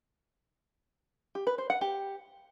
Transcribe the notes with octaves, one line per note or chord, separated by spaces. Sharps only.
G4
B4
C5
F#5
G4